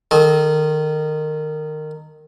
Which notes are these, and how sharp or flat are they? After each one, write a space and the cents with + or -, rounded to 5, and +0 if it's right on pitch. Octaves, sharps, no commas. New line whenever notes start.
D#3 -20 A4 -40